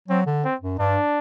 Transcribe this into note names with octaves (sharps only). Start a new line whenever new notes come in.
F#3 C4
D3
C4
F#2
G2 D4